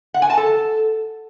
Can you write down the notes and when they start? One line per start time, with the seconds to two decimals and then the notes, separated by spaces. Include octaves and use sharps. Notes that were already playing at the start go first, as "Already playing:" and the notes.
0.14 F#5
0.22 G#5
0.30 A5
0.37 A4